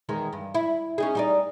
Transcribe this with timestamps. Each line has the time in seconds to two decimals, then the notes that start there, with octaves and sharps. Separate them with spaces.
0.09 E2 D#3 G#3
0.33 G2
0.54 E4
0.98 C#4 D#4 G#4
1.15 G3 D#4 D5